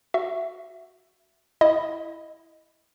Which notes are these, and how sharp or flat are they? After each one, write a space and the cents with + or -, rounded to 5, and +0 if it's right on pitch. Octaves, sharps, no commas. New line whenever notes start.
F#4 +0 E5 +15
E4 +0 D#5 +0